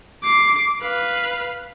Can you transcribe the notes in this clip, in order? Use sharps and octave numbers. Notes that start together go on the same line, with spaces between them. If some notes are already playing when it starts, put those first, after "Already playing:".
D6 C7
B4 F5